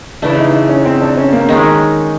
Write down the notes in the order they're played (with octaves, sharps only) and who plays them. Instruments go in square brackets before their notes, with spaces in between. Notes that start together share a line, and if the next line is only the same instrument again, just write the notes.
[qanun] C#3 E3 A3 [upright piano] D4
[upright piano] D#4
C#4
C4
D4
C#4
A#3
[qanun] D#3 G#3 C#4 [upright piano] D#4